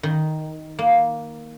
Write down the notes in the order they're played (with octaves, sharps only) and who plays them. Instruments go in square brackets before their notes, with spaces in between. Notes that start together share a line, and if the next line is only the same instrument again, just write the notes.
[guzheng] D#3
A#3